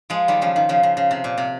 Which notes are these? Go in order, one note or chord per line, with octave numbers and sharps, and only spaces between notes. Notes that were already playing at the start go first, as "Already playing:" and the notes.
F3 G#3
D#3 G3
C#3 F3
D#3
C#3 F3
C#3
C#3
C3
A#2
C3